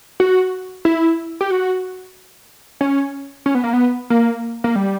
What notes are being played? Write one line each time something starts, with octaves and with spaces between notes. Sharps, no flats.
F#4
E4
G4
F#4
C#4
C#4
B3
A#3
B3
A#3
A#3
G3